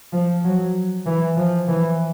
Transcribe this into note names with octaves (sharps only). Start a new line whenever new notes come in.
F3
F#3
E3
F3
E3